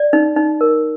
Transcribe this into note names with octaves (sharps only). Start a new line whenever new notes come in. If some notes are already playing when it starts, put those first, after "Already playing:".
Already playing: D5
D#4
D#4
A#4